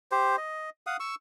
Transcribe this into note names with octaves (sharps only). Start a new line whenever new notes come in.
G4 C5
D#5
F5 F#5 D#6
C#6 E6